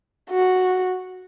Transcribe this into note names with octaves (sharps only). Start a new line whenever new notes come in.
F#4